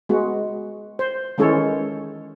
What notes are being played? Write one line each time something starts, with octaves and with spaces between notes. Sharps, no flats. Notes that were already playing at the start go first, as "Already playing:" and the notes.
G#3 B3 F#4
C5
D#3 E3 G#3 C#4 A4 C#5